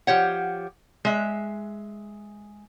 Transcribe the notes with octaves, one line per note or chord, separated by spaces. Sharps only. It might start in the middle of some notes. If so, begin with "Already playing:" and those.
F3 G4 C#5 F#5
G#3 E5